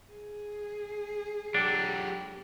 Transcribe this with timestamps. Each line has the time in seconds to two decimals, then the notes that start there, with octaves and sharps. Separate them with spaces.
0.13 G#4
1.54 F#3 D4 G4 A4